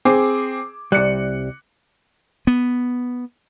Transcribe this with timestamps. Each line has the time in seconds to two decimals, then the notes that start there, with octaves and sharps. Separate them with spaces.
0.05 C4 G#4 D6
0.92 C2 G3 F#6 C#7
2.47 B3